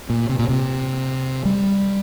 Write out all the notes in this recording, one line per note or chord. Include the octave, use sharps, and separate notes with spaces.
A#2
C3
A#2
C3
G3